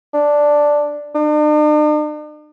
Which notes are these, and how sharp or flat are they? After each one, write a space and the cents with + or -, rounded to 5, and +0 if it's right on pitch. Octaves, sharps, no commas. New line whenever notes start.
D4 +0
D4 +45